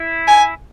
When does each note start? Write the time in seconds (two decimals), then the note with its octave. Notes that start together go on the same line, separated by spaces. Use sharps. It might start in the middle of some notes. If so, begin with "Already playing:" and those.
Already playing: E4
0.28 G#5